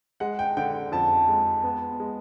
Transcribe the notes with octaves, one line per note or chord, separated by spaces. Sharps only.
G#3 F#5
G5
D3 G5
F2 A5
G#3
B3
G#3